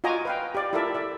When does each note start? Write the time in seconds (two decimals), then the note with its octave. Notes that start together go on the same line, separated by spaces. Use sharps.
0.04 F4 F#4 D#5 G#5 A#5 D6
0.25 B4 F5 G5
0.55 G4 D5
0.73 E4 F4 A4 A#4 D5 E5
0.95 D5 E5